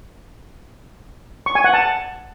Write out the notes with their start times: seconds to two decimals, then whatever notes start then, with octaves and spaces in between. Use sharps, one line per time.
1.46 C#6
1.55 G#5
1.64 F#5
1.73 A5